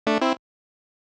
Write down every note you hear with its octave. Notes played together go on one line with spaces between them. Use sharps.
A3 D4
C4 E4